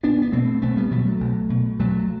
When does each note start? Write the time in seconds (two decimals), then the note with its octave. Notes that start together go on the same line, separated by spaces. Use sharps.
0.03 B1 B3 D4
0.22 B3
0.32 B2 A3 C4
0.62 B1 A3 C4
0.77 G3 B3
0.91 B2 F#3 A3
1.06 F#3 A3
1.20 B1
1.50 B2
1.79 B1 F#3 A3